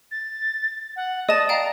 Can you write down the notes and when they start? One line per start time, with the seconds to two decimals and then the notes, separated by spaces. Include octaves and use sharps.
0.11 A6
0.96 F#5
1.29 D5 D#5 A5 A6
1.49 F5 G5 A#5